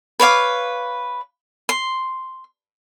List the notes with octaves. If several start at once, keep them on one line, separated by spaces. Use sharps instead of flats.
B4 C#5 F5 D6
C6